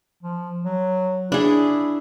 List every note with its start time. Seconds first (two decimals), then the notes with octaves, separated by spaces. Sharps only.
0.23 F3
0.65 F#3
1.32 D4 E4 G#4